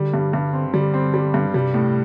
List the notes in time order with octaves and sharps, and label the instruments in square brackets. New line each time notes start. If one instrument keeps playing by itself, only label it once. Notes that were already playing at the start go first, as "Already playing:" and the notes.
Already playing: [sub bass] D3 [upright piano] G3
[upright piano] G2
G2
C4
[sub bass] D3 [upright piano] G3
[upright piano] C4
G3
G2
[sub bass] C3 [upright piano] G3
[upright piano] A2